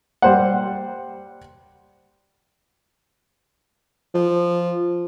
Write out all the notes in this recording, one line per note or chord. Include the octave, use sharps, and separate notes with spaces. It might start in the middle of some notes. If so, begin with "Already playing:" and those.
G3 C5 F#5
F3